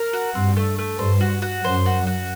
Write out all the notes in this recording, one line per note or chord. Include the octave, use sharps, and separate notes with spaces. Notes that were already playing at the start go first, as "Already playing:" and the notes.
Already playing: A#4
F#4
G2 C4
A3
A3
G2 C5
F#4
F#4
F#2 C5
F#4
F#4